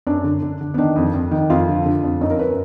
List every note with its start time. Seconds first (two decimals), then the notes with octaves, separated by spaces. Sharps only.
0.07 F#2 D4
0.24 D3
0.42 D3
0.61 D3
0.74 B3
0.78 D#3 D4
0.96 F2
1.14 F2
1.31 D#3
1.50 F2 F4
1.68 D3
1.86 D3
2.04 F2
2.21 F#2 D#4
2.30 A#4
2.39 F#2 B4